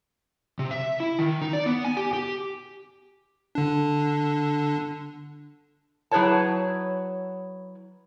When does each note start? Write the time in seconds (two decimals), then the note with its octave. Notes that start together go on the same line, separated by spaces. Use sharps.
0.59 C3
0.71 E5
1.00 E4
1.19 D#3
1.42 D#4
1.53 D5
1.66 B3
1.84 G#5
1.97 G4
2.13 G4
3.55 D3 D4
6.11 F#3 E4 G#4 B4 C#5 A5